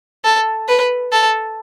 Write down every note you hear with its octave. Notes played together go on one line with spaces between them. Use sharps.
A4
B4
A4